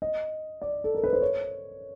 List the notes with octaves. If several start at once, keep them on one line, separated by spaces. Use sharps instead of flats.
D#5
D5
A4
A#4
B4
C5
C#5